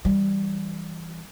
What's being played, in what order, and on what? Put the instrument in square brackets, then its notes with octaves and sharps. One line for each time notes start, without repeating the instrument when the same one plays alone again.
[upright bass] E3 G3